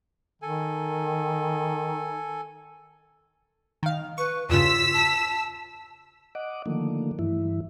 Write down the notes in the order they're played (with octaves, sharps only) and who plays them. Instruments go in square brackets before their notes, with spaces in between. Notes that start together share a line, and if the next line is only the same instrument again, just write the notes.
[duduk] D#3 [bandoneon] A4 G#5
[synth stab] D#3 F5
[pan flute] B4 [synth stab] C#6
[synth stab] E2 G2 C#3 [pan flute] F4 [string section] E6 B6
[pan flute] A5
[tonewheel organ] D#5 F#5 D6
D3 D#3 F3 A3 A#3
G2 E3 E4